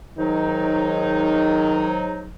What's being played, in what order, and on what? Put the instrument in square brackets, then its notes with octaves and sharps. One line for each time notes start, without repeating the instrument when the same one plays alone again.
[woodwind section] G#2 F#3 D#4 [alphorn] D#3